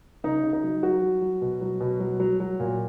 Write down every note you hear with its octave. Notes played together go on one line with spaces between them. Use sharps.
C#3 D#4
C#3
D#4
F#3
F#3 F#4
F#3
F#3
B2
F#3
B2
F#3
F#3
F#3
A#2